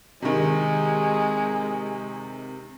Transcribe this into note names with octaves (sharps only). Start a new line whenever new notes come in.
C3 D#3 G#3